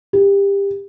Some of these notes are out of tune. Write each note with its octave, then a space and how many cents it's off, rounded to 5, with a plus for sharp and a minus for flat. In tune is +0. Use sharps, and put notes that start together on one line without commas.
G4 +25